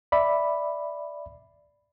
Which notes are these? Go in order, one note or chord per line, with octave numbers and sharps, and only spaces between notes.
D5 E5 B5